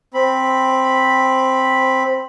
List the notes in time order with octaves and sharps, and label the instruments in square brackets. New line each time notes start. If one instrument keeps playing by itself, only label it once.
[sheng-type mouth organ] C4 B5